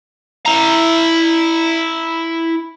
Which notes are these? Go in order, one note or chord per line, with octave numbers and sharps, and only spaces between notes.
E4 A#5